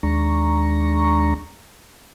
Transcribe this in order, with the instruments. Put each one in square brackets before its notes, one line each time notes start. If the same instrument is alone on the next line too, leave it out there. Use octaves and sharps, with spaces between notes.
[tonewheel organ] D#2 G#3 D4 A#5 C#6